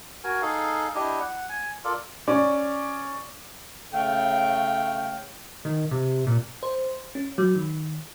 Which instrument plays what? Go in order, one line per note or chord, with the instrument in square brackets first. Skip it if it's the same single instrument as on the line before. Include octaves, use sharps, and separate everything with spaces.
[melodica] F#4 A#4 G#5
D#4 G#4 A4 F5
D4 E4 G4 D#5
F#5
G#5
F4 A4 A#4 D5
[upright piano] C#4 D5
[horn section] C#3 A3 F5 G5
[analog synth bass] D#3
C3
A#2
[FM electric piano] C5
C#4
F#3
D#3